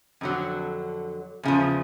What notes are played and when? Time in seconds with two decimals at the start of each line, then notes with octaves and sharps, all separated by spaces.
0.21 F2 D3 F#3
1.43 E2 C#3 F3